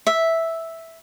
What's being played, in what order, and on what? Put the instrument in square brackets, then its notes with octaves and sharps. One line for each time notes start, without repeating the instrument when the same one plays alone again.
[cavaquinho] E5